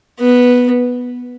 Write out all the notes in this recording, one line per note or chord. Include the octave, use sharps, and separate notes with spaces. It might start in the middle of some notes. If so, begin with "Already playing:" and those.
B3